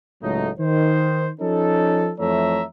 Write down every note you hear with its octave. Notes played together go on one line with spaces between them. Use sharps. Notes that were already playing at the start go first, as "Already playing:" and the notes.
C#2 A2 F#3 A3 D#4
D#3 C5
F3 C#4 D#4 A4
F2 E3 A3 C#5 E5 A#5